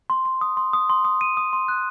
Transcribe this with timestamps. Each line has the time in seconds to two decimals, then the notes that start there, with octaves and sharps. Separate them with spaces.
0.10 C6
0.25 C6
0.41 D#6
0.57 C6
0.73 D#6
0.90 C6
1.05 D#6
1.21 D#7
1.37 D#6
1.53 C6
1.68 F#6